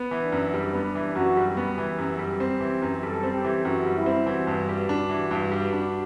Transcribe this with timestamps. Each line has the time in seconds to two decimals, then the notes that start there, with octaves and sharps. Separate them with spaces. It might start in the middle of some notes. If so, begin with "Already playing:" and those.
Already playing: B3
0.11 E3
0.22 D4
0.32 F#2
0.54 G3
0.74 B3
0.95 E3
1.15 F#2 F#4
1.37 G3
1.46 G4
1.57 B3
1.78 E3
1.98 F#2
2.19 G3
2.40 C4
2.61 E3
2.82 F#2
3.03 G3 A4
3.23 C4
3.33 G4
3.45 E3
3.65 F#2 F#4
3.86 G3
3.96 E4
4.06 C4
4.26 E3 F#4
4.47 G2
4.69 G3
4.89 D4
5.09 E3
5.31 G2
5.51 G3
5.73 D4